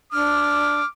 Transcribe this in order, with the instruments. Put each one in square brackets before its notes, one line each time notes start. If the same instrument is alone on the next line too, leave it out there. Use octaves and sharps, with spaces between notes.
[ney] D4 [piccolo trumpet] D6 [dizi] F6